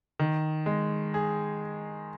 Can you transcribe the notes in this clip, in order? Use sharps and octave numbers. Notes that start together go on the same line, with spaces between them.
D#3
G#3
G#4